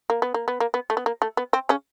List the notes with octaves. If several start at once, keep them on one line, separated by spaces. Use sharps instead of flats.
A#3
B3
A#3
B3
A#3
B3
A3
B3
A#3
A3
B3
C4
C#3 C#4